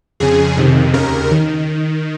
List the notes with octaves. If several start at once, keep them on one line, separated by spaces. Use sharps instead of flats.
F2 C#3 G#4
F2 C3 D#3
D#2 C#3 A#4
D#3